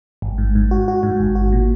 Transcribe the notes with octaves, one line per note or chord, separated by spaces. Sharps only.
G#1
G#2
G#2
F#4
F#4
G#2
G#1
F#4
A#2